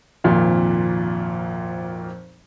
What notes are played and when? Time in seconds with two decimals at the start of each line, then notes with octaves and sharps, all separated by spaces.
0.24 G#1 F2 A#2